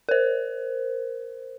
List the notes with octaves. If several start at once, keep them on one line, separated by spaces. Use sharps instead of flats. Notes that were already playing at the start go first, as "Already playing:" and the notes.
A#4 C5